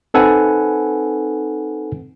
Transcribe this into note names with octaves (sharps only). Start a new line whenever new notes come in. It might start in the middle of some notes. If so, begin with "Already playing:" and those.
C4 D#4 A4 B4 F#5 G#5